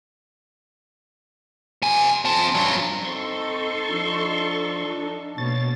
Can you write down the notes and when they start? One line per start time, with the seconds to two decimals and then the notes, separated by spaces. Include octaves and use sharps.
1.82 C3 G#5
2.25 C4 A5
2.55 G2 F#3
3.05 C4 D#4 A4 C6 C#6
3.89 F3 D4
5.38 B2 A#3 C#5 A6